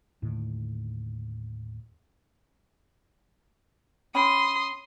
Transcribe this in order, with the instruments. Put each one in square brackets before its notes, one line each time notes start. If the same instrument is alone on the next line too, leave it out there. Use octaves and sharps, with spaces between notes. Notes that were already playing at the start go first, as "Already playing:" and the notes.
[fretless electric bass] D#2 A2 D3 D#3
[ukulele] C#4 G5 B5 [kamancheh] C6 D#6